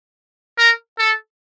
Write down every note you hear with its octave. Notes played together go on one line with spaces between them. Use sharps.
A#4
A4